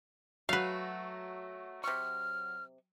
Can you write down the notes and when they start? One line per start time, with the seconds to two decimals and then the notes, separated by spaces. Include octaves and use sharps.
0.49 F#3 A3 F#4 B4 F5
1.84 C3 C#6 F6